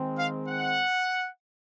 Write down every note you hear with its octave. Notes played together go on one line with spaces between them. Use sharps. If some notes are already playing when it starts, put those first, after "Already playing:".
Already playing: D#3 G#3 C4
F5
F#5